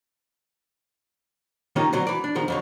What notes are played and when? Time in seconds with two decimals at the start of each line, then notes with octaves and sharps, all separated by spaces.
1.76 D#3 A#3 C#4 D#4 F4 G4
1.93 D3 F#3 C4
2.07 E3 D5
2.24 D4
2.35 B2 D#3 F3 G#3
2.48 F2 D3 F#3